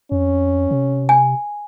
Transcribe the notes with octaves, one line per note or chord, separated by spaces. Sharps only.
F2 C#4
C3
G#5